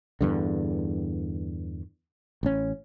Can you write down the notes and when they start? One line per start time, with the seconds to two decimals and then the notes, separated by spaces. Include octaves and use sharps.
0.21 E2 G2 D3
2.43 A1 C#4